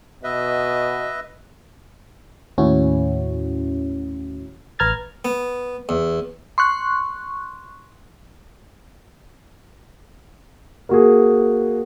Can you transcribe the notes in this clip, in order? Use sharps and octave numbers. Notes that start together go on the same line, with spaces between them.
B2 B4 D#5 E5
D#2 A2 C#4 E4 F#4
A1 B4 A#5 F6 G#6 A6
B3
E2
C6 C#6 F#6
A#3 F#4 G#4